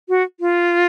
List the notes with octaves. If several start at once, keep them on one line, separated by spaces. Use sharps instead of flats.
F#4
F4